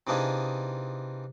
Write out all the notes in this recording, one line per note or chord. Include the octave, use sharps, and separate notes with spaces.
C3 E3 D4 D#4 F4 G#4